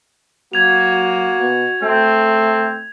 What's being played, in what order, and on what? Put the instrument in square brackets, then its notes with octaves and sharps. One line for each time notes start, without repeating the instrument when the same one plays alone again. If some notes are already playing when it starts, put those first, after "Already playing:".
[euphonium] F#3 [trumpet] A#3 [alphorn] F#4 [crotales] G#6 F7
[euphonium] B2
[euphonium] A3 [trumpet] C4